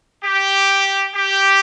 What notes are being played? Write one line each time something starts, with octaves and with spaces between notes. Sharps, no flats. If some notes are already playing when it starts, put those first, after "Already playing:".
G4
G4